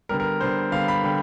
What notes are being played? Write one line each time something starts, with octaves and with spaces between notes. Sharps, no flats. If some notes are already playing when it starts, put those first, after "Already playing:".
D3 G3 B3 A#4
A#4
D3 G3 B3 C5
D3 G3 B3 F5
B5
D3 G3